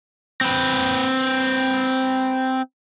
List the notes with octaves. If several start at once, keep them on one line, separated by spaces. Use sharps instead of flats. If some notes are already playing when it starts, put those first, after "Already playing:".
C4 B4